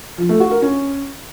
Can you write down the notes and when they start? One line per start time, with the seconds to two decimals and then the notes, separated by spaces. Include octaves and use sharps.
0.18 F3
0.29 A3
0.40 F#4
0.51 A#4
0.62 C#4